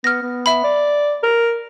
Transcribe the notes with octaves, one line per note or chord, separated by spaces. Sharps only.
B3 F6 A#6
B3
E5 B5
D5
A#4